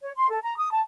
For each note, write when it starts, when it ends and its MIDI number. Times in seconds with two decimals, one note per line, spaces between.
0.01 0.11 73
0.16 0.29 84
0.29 0.39 69
0.42 0.54 82
0.57 0.72 87
0.72 0.81 81